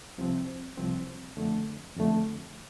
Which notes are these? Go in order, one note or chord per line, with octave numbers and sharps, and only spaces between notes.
C2 C3 F3 C4
C2 C3 F3 C4
F2 D3 A3
F2 D3 A3